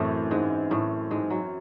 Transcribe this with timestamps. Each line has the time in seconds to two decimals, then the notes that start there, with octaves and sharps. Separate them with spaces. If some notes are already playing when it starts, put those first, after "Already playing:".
Already playing: F#2 A2 E3 A3 C4
0.31 G#2 G#3
0.71 A2 A3
1.11 G#2 G#3
1.30 F#3